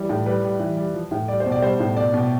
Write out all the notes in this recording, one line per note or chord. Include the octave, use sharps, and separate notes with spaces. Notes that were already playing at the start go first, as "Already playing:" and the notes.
Already playing: E3 G3
A2
G3 B4
G3
E3
G3
F3
A2
G3 D5
C5
B2
D5
G3 C5
A2
B2 D5
B2